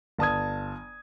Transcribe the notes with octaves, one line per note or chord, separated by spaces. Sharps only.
G1 A5 D#6 G#6